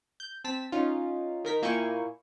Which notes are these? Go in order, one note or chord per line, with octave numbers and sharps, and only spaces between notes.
G6
C4 A5 B6 E7
C#4 D#4 F4
D#3 A#4 B6
A#2 A#3 E4 G5 G#5 C#6